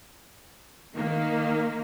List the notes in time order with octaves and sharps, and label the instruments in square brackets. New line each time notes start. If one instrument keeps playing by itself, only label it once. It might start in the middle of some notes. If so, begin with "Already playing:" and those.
[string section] D#3 A#3